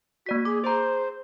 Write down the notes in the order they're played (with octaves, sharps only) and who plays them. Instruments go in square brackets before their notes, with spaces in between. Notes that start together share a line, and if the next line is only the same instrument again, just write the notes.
[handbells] A#3 D5 B6 [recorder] F#4
[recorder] G#4 [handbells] D6
[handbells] G#4 A#5 [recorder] C5